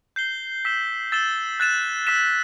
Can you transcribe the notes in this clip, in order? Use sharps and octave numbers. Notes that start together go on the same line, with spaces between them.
G6 C7 G7
E6 B6 E7 G7
E6 A6 E7 G7
F#6 A6 E7
E6 B6 E7